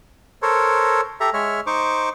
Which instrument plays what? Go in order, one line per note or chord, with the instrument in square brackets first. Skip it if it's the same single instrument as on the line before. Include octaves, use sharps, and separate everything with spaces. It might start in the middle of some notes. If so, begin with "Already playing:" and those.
[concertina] A4 A#4 C5 C#5
G4 A4 E5 A#5
G#3 C#5 E5 F6
D#4 C5 C#6 D6